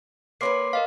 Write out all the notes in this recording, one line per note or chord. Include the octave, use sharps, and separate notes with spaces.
A#3 C#4 B4 C6 D6 C7
A#4 D#5 F5